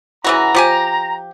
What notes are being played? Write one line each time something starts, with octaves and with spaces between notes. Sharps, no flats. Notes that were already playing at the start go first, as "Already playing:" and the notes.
C#3 E3 F#4 A#5
F3 G4 G#5